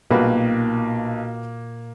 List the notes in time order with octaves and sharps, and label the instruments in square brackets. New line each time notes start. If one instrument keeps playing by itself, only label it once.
[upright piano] B1 [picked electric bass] A#2 [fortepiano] G3 F#4 B4 [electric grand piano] A#3